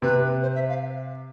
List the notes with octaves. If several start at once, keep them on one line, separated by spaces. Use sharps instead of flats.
C3 B4
C5
E5
F5